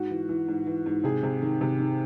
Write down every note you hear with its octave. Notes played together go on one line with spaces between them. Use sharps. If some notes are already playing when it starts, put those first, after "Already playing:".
Already playing: G#2 F#4
E3
E3
G#2
E3
G#2
C3 G#4
C3
D#3
C3
D#3